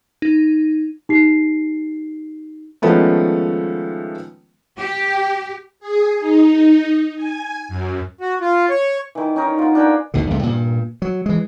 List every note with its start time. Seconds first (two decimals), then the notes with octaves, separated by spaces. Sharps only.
0.22 D#4
1.09 D#4 G4 C7
2.82 D#3 F3 G#3 A3 B3 C#4
4.79 G4
5.80 G#4
6.19 D#4
7.15 G#5
7.68 F#2
8.21 F#4
8.41 F4
8.70 C#5
9.15 D#3 E3
9.36 C#4 D#4 A#4
9.59 B3 F4
9.75 D4 A#4 G5 G#5
10.14 G#1 D#2 B2 D3
10.31 C#2 G2 C3 A3
10.43 G2 A#2
11.02 F#3
11.26 E3 G#3